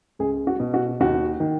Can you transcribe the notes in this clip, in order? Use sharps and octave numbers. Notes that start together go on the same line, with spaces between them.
C#2 G#4
F#4
B2
F#4
D#2 F#4
D#3